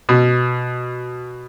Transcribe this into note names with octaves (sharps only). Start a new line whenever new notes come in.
B2